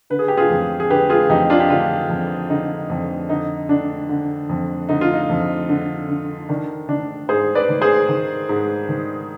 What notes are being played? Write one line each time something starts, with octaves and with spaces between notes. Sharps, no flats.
D3 B4
G#4
G4
F4 G#4
F2
G#4
D3 G4 B4
F4 G#4
F2 D#4 G4
D4 F4
G4
D3 D4 F4
F2
D3 D#4
F2
D3 D#4
D3 D4
D3
F2
D3 D#4
F4
D#4
F2
D3
D3
D#3 D4
D#3 D4
G#2 G#4 C5
B4 D5
D#3
G#4 C5
D#3
G#2
D#3